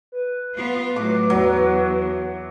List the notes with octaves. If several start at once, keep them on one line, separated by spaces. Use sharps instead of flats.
B4
B3 F4
A2 F#3 D6
E2 F#3